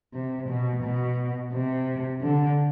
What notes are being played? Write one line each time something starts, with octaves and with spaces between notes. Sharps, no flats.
C3
B2
B2
C3
D3